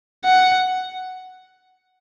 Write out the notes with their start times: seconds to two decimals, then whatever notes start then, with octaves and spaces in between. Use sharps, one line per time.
0.24 F#5